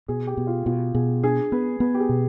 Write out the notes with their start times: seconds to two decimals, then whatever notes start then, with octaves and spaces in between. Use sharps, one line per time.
0.08 B2 G#4
0.27 G4
0.37 B2
0.47 F4
0.66 B2 F4
0.94 B2 G#4
1.23 D4 G#4
1.52 B3 B4
1.80 B3 B4
1.94 G4
2.00 G#4
2.09 B2